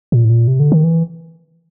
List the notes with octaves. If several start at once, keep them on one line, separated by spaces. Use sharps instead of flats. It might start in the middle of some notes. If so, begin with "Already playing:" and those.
A#2
A2
A#2
C3
D3
D#3
E3